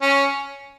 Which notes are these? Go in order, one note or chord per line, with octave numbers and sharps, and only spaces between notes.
C#4